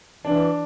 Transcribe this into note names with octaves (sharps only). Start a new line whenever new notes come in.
E3 D4